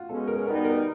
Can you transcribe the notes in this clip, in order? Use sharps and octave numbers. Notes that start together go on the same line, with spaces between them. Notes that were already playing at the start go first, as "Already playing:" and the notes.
Already playing: F4 F#4
B2 G#3 C#4 A4
A#4
B2 G3 B3 D#4 A#4
A#4